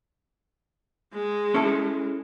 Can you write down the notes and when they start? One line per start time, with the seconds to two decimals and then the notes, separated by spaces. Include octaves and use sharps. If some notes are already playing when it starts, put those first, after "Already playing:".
1.14 G#3
1.54 C#4 E4 A4